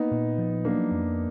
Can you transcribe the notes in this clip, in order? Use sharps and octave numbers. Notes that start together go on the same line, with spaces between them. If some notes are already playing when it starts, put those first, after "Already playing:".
Already playing: A#3 B3 D#4
A#2
F3
F#3 A#3 D4
F2